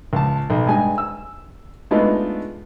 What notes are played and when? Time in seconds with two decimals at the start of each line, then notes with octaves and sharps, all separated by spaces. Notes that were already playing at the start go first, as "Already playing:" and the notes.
0.13 C#2 A5
0.50 B1
0.67 G2 G#3 G#5
0.98 E6
1.91 G#3 A3 B3 D4 D#4 F4